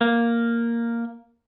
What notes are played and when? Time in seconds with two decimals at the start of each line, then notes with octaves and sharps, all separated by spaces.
0.01 A#3